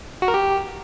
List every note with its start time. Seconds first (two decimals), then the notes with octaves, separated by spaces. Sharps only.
0.22 F#4
0.28 A#4
0.34 G4